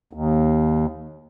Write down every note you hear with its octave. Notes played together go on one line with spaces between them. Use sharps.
D#2